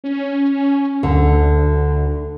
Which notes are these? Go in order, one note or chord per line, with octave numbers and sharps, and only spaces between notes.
C#4
D2 D3